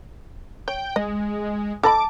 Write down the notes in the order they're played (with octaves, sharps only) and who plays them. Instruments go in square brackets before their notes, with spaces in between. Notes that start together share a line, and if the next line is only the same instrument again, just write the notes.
[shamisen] C#5 [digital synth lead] G5
[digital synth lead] G#3 [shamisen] D#5
[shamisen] A4 D#5 B5 [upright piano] A5 [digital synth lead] D6